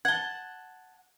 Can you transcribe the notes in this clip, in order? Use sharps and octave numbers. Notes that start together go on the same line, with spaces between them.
F#5 A5 G#6 G7